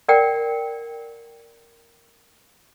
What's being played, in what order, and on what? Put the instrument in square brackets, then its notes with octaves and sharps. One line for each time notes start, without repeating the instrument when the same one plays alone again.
[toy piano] A#4 D5 F#5 G5